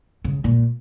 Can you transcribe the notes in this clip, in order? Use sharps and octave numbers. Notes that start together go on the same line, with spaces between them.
C#3
A#2